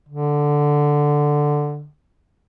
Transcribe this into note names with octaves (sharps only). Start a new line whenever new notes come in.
D3